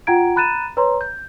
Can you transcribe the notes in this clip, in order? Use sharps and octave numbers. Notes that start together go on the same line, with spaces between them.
F4 F#5 G5 A#5 G#6 D7
A#5 B5 F#6 A6 D#7 E7
B4 C#5 A#5 C6
G6